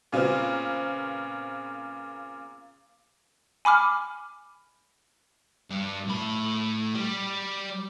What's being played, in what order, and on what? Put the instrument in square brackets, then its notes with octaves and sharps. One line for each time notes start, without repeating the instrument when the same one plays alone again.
[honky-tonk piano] A#2 C#3 B3 C4
[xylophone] G#5 B5 D6 F6
[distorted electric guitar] G2 G3
A2 B5
G3